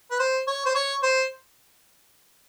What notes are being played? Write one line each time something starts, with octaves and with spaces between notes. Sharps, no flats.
B4
C5
C#5
C5
C#5
C5